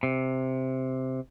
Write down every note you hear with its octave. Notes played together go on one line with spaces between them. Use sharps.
C3